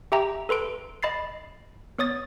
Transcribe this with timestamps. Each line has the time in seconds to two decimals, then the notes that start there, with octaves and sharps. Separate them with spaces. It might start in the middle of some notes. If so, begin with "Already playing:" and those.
0.12 G4 E5 G5 A#5
0.49 A4 B4 C6 D7
1.03 D#5 B5 A6 C7
1.98 B3 C#5 D#6 A6